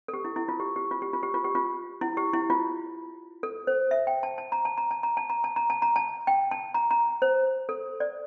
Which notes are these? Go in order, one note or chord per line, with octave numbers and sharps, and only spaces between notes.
A4
G4
E4
E4
F4
G4
G4
F4
G4
F4
G4
F4
G4
F4
E4
G4
E4
F4
A4
C5
E5
G5
A5
A5
A#5
A5
A#5
A5
A#5
A5
A#5
A5
A#5
A5
A#5
A5
G5
A5
A#5
A#5
C5
A4
D5